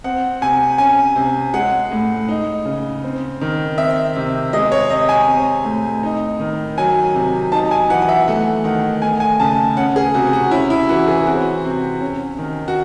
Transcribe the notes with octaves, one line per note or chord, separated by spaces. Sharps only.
C4 F#5
C3 G#5
C#4 G#5
C3
G#3 F#5
A2
D#4
C#3
C4
D#3
C4 E5
C3
G#3 D#5
C#5
C3 D#5
G#5
C4
A2
D#4
D#3
F#3 G#5
C3
D#4 A5
G#5
E3 F#5
F#5
E5
A3 F#5
D#3 F#5
A3 G#5
G#5
C#3 A5
C#4 F#5
G#4
C3 F#4
F#4
C#4 E4
E4
E3 F#4
G#4
C4 F#4
C3
C#4
D#3
F#4